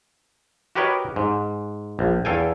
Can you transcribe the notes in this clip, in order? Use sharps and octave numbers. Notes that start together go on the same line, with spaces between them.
F#4 G4 A#4 B4 C#5 D#5
G#2
A#1
E2 A4 F5 G5 G#5